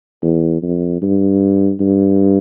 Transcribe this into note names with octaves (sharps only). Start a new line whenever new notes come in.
E2
F2
G2
G2